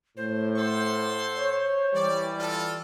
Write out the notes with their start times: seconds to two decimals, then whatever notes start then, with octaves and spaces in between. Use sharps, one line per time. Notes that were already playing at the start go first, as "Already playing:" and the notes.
0.17 A2 C5
0.58 A4 F#5 C6
1.37 C#5
1.95 E3 G3 D5
2.38 F4 A4 D5